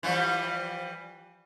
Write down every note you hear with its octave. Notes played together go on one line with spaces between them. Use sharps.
E3 F3 G3